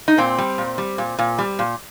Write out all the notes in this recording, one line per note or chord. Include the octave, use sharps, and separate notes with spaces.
D#4
A#2 C4
G3
A#2
G3
A#2
A#2
G3
A#2